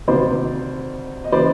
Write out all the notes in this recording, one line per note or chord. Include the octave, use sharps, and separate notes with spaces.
D2 C3 D#3 C5 D5
D#5
C#3 E3 C5 D5